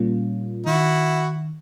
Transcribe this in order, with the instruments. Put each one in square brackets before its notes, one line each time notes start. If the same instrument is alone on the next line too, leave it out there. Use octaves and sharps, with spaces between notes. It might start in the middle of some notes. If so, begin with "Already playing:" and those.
Already playing: [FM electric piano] A#2 G3 A#3 C#4 F4
[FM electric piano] D#3 [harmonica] E4 F#4